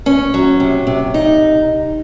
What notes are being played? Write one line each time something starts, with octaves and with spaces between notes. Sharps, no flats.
C#4
F#3
C3
C3
D#4